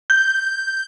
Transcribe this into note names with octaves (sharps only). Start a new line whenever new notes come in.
G6